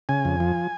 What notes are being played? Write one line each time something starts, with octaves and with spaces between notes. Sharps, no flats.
C#3 G#5
F2
F3